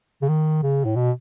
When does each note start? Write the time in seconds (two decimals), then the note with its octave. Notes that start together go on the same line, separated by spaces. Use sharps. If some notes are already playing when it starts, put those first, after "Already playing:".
0.21 C#3
0.28 D#3
0.62 C#3
0.84 A2
0.95 B2